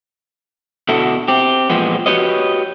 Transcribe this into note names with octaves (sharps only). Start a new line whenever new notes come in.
B2 D3 E4 F#4 A4
C4 G4
A#2 E3 F3 G#3 B3
F#4 G4 B4 C#5 D#5